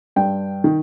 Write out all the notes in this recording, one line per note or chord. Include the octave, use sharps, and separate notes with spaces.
G2 G5
D#3